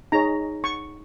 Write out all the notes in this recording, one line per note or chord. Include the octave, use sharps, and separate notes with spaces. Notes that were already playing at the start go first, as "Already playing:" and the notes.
D#4 G#4 C#5 A#5
C#6